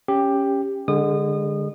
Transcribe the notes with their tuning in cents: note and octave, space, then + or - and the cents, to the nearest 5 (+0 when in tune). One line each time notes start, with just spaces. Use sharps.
C#4 +0 G4 +10
D3 +0 G#3 -30 D#6 -30